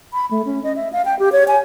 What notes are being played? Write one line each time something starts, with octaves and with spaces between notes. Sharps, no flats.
B5
A3
C#4
D#5
E5
F5
G5
G4
C#5
G#5